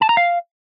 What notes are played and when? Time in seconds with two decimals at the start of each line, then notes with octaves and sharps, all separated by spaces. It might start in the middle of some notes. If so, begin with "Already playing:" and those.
0.01 A5
0.09 A#5
0.17 F5